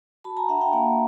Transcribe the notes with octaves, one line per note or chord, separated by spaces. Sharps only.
F#4 A5 B5
G#5 A#5
D4 E5 F#5
F5 G5
A#3 F#5 G#5